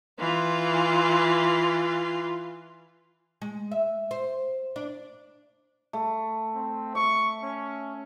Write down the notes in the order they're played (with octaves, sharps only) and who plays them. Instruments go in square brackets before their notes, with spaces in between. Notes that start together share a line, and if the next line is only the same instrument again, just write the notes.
[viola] E3 F4
[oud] G#3
E5
C5
D4
[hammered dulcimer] A3
[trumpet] C4
[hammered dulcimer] E5 [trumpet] C#6
[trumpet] C#4